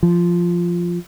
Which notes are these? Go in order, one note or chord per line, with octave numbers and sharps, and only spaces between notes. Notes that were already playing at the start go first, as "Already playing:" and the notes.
F3